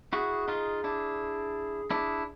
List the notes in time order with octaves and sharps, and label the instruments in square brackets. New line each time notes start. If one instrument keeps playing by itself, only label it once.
[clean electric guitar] E4 F#4 [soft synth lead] G#4
[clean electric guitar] D#4 F4
D4 E4
[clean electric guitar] D4 E4 [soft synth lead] G#4